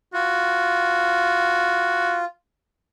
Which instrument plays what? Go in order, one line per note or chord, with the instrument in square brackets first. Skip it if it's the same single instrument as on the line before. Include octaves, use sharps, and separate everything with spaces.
[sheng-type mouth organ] F4 [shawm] F#4